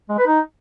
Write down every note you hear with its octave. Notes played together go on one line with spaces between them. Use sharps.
G#3
B4
D#4